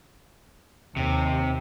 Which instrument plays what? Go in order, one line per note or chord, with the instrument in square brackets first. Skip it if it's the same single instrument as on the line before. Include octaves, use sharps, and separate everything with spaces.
[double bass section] D#2 [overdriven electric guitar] C3